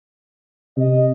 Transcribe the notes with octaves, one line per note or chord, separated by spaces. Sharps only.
C3 D#5